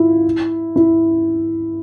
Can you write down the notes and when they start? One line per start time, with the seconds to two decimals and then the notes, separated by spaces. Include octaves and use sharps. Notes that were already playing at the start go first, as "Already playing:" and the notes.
Already playing: E4 F4
0.76 E4